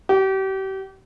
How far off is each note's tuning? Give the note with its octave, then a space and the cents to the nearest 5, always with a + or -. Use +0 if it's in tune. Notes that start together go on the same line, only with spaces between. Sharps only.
G4 -35